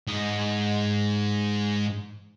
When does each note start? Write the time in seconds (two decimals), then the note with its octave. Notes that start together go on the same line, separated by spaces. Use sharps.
0.07 G#2 D#5